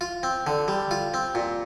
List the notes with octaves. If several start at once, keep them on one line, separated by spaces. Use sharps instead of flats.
F4
C4
D3
G3
F4
C4
A#2